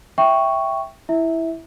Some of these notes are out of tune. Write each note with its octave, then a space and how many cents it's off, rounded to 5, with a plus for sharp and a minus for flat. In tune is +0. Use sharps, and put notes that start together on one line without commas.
E5 +0 G5 +0 C#6 +0
E4 +0 E5 -15